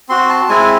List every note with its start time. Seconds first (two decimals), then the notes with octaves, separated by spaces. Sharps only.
0.09 C4 F#4 C6
0.29 A5
0.49 G#3 C4 E4 G#5